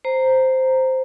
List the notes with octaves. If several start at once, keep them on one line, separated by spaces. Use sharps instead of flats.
C5 A#5